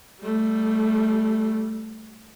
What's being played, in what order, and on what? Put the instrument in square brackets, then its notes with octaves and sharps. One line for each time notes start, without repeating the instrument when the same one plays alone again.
[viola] G3 A3